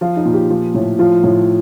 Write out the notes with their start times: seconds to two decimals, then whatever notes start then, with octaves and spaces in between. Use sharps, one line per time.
0.01 F3 F4
0.17 D#4
0.26 A#2
0.33 G4
0.50 F3
0.75 A2
0.99 F3 F4
1.24 A2